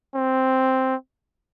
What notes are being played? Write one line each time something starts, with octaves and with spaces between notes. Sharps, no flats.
C4